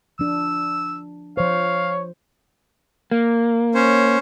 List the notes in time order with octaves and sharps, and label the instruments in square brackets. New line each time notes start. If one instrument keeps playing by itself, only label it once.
[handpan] F3 D4 [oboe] E6
[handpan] F3 C5 [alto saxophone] C#5 [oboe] F5
[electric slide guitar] A#3
[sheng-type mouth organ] C#4 C5 C#5